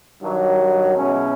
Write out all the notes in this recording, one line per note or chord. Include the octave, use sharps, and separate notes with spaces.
G2 D#3 F#3
B2 G#3 C#4 E4